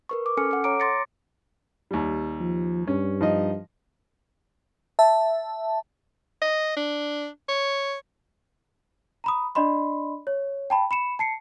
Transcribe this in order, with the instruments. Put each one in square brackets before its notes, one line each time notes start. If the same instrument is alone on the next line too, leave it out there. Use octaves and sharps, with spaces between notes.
[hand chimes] A#4 B4 C#6
D6
C#4 A4 G#5 F6 C#7
A4 F#5
C#5 A#5 D6 D7
C6 D6 A6 A#6 C#7
[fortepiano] D#2 G3
[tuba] F3
[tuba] G2 [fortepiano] C#4
[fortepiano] F3 D#4 D#5
[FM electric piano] E5 A5
[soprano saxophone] D#5
D4
C#5
[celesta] A#5 B5 D#6
D4 D5 D#5 B5 C6
C#5
G5 A5 B5
B5 C#7 E7
A5 C7 C#7